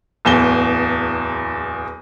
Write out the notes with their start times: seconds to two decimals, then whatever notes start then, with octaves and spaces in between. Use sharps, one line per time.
0.25 D1 E2 G7